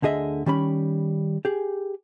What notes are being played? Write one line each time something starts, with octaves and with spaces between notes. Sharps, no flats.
D2 D3 G#4 D#5 E5
D#3 G3 C#4 B5
G4 G#4